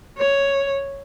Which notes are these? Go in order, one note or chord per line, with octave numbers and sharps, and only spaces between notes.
C#5